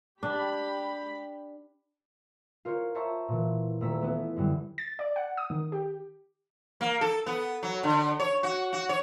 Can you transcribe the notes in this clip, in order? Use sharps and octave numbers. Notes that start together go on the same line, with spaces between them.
D4 G4 B5
F4 A#4 C5 C#5
C5 C#5 E5 A5 A#5 C#6
A#2 E3
D#1 A3 C#4 A#5 E6 B6
A3 B3 E4
F#2 D3 F#3 G3
A6
D5
F#5
D#6
D#3
G4
A#3
A4
B3
F#3
D3
C#5
F#4
F#4
C#5